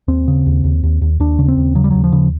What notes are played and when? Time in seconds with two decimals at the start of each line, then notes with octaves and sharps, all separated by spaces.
0.08 D#2 C4
0.28 C#3
0.46 D#2
0.64 D#2
0.83 D#2
1.01 D#2
1.20 D#2 D4
1.39 C#3
1.48 C4
1.57 D#2
1.75 C#3 F#3
1.84 G3
1.90 D#2 F#3
2.04 F3
2.12 C#3